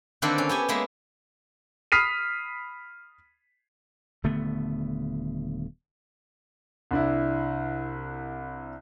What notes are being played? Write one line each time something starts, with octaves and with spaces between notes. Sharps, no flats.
D3 D#3 A#3 C4 A4 B4
C#4
B3 G4 G#5
G#3 A#3 B3 E5
B5 D#6 F6 B6 C7 D#7
D#1 D3 A3 B3
C2 D4 E4